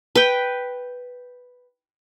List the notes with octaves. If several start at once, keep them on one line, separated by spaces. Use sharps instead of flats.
B4 G5